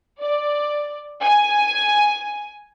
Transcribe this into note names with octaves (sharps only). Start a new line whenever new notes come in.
D5
G#5